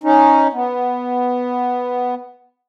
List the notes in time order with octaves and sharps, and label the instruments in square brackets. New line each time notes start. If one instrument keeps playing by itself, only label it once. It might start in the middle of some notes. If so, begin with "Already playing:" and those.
[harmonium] C#4 D#4
B3